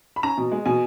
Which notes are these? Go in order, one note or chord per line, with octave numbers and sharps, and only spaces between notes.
B5
C#4 A#5
B2
G#3
B2 G#5